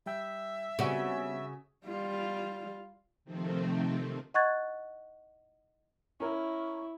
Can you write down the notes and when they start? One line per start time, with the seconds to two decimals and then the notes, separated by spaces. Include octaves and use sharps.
0.06 G3 E5 G5
0.79 C#3 G3 B3 C4 F#4
1.86 G3 F4
3.25 C3 D#3 F3 A3 C4
4.34 D#5 F#5 C#6 F#6 G#6 A6
6.20 C#4 E4 A#4 C#6